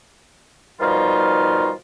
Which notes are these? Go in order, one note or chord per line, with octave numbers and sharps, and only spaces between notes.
B2 D#3 F3 G3 D#4 F4